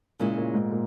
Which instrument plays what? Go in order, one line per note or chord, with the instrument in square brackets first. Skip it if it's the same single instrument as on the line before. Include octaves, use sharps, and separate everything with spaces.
[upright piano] A#2 [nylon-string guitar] C#3 G#3 C#4 E4
[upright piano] A#2
G#2
A#2